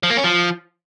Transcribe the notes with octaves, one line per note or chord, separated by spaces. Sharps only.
F3
A#3
C#4
F3